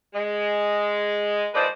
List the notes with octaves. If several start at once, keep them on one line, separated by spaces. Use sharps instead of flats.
G#3
D#3 F3 G#3 B4 C5 D5